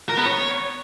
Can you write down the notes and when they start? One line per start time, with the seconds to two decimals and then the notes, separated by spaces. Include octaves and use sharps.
0.09 A#4
0.17 B3
0.26 C#5